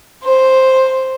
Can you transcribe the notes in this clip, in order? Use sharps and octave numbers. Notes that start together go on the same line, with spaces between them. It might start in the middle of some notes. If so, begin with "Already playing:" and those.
C5